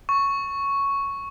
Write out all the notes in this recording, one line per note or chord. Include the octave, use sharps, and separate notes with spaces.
C#6